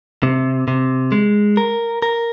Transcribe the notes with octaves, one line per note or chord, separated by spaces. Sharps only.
C3
C3
G#3
A#4
A#4